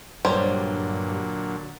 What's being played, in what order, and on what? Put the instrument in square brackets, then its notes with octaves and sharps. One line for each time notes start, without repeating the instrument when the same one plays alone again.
[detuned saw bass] G2 [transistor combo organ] A#2 D3 F#3 [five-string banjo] G3 C5 C#5